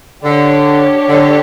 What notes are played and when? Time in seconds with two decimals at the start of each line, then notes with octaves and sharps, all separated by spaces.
0.23 D3 D4 G4 C#5
1.09 D3